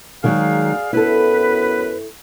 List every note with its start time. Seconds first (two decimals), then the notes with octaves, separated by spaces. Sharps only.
0.24 D#3 F#3 G#3 G#4 D5 F5
0.93 F#2 B3 E4 A4 B4